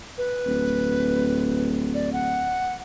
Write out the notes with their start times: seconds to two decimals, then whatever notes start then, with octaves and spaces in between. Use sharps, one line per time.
0.18 B4
0.46 D1
1.94 D5
2.13 F#5